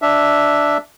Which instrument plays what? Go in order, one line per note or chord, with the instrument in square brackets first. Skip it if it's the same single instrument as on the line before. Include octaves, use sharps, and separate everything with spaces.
[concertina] D4 E5